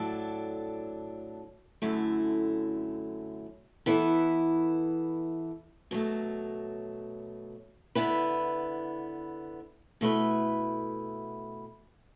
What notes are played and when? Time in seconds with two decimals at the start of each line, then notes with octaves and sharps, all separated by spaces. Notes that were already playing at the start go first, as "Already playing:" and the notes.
Already playing: A2 F#3 D4 A4
1.82 F#2 D3 F#3 A3 E4
3.86 E3 B3 E4 A4
5.91 B2 F#3 A3
7.95 D3 B3 E4 B4
10.01 B2 A3 E4 B4